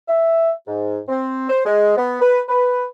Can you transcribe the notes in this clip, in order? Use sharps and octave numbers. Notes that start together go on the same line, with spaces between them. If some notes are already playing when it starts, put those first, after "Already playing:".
E5
G#2
C4
C5
G#3
B3
B4
B4